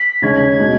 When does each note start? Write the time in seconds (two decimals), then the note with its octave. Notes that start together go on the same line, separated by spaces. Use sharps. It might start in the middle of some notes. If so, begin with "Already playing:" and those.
Already playing: B6
0.22 D#2 C#3 G#3 C#4 G#6
0.58 B2 G#3 D#4